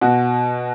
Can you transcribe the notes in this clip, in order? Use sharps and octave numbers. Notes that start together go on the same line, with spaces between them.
B2 F#4